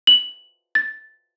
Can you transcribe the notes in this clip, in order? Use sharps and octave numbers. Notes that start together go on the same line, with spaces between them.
F#7
A6